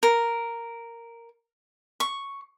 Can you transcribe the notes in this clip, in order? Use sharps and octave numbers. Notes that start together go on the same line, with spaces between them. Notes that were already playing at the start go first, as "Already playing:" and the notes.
A#4
C#6